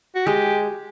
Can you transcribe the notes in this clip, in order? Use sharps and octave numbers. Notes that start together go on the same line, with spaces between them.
F#4
G#3 G4